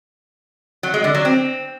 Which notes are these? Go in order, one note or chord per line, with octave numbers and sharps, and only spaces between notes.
F#3
G#3
D3
F#3
C4